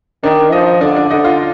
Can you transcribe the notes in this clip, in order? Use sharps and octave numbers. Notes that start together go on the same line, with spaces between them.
D#3 D4 D5
F3 D#4 D#5
D3 D4 D5
D4 D5
D3 D#4 D#5
F4 F5